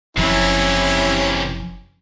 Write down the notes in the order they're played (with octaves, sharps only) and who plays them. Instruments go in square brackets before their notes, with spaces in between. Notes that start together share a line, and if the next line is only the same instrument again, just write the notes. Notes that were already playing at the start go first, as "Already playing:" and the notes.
[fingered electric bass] F#1 F3 [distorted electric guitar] C3 E3 [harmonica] C#4 E4